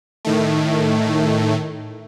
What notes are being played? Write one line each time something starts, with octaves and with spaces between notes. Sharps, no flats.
A2 D#3 A3